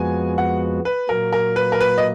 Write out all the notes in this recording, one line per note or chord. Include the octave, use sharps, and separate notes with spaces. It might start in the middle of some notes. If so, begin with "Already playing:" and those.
Already playing: F2 F3 G#3 B3 F#4 G#5
F#5
B4
A#2 F#3 A#3 A#4
A#4
B4
A#4
B4
D#5